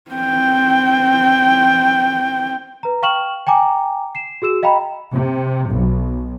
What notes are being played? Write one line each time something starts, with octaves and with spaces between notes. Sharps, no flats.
C4 G5
B4 A#5
F5 G5 C#6 F6 E7 F#7
G5 G#5 A#5 D6
C7 E7
F#4 G#4 E6 E7
D#5 F5 G5 A#5 B5
C3
B1